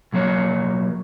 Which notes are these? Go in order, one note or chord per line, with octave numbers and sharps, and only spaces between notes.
B1 F#3 A#3 C#5